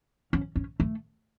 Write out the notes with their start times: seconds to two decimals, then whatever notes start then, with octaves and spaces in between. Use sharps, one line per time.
0.33 C#4
0.56 C#4
0.80 A3